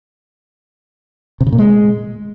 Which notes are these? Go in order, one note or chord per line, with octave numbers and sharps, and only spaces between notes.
C3
C#3
A#2
G#3